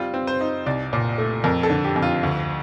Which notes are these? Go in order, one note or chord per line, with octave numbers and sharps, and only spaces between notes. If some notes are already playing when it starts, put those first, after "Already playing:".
Already playing: G3 C4 F4
C4
C5
D#4
C2 D5
A#2
A3
F2 A#4
A4
D3
G4
F2
F4
D2